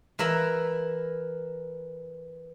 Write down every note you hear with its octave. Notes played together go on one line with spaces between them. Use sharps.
E3 A#4 E5 B5